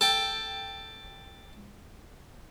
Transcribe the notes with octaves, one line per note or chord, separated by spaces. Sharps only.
A4 G5